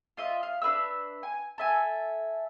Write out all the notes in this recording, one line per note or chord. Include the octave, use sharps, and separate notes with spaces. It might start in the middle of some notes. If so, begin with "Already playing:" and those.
F4 D#5 E5
F5
D4 B4 E5 E6
G#5
A4 E5 G#5